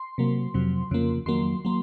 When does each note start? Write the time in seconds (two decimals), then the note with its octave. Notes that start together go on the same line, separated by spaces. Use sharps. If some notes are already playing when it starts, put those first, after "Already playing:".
Already playing: C6
0.18 C3 F#3 A#3
0.54 F2 C3 F#3
0.91 F2 C#3 F3 A#3
1.26 F2 D#3 F#3 A#3 C6
1.65 F#3 A#3